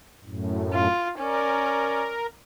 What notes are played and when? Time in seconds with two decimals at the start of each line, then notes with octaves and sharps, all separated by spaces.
0.24 F#2 A2
0.74 F4
1.19 C#4 A#4 D5